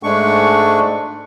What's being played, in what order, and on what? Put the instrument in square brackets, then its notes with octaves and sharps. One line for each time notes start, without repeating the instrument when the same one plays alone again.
[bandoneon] G#2 G#3 A3 D4 C#6